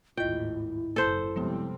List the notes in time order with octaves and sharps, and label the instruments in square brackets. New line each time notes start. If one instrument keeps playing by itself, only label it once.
[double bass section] G#1 D#2 A2 [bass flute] E4 [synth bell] F4 D#5 [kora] G5
[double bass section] F#1 [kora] A4 C5
[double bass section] C3 G3 C4 [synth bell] F3 G#3 B3